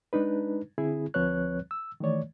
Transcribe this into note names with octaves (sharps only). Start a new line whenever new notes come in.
G#3 D4 D#4 B4
D3 C4 E4 G#4
D2 F3 C4 B4 C#5 F#6
E6
D#3 E3 A3 C#5 D5